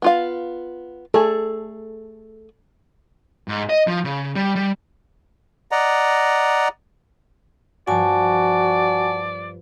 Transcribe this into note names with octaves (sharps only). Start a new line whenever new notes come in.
B3 F4 F5
A3 G#4 A4
G#2
D#5
F3
C#3
G3
G3
D5 D#5 F#5 A#5
G2 F3 F#4 D5 G#5 A5